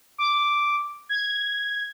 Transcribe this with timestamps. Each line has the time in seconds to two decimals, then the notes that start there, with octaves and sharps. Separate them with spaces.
0.18 D6
1.09 G#6